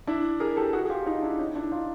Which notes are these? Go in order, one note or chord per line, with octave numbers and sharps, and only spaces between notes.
D4 E4
G#4 A#4
G4 A4
F#4 G#4
G#4
F4 G4
D#4 F4
D4 E4
C#4 D#4
D4 E4
D#4 F4